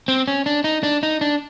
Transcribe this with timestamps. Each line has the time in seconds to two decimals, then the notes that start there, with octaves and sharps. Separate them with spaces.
0.08 C4
0.28 C#4
0.46 D4
0.64 D#4
0.83 D4
1.03 D#4
1.21 D4